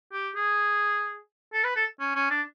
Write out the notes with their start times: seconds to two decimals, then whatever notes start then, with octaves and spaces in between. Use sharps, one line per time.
0.13 G4
0.36 G#4
1.53 A4
1.64 B4
1.76 A4
2.00 C#4
2.15 C#4
2.30 D4